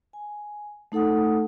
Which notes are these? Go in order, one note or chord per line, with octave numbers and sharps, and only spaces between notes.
G#5
A3 D#4 A4 F#5 D#6